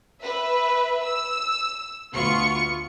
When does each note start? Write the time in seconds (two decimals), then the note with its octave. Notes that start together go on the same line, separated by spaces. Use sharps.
0.21 B4 E5
1.03 E6
2.12 D2 B3 F4 C#6 C#7